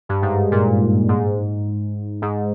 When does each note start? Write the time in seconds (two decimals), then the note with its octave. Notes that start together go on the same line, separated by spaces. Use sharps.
0.09 G2
0.22 G#2
0.52 A#2
1.09 G#2
2.22 G#2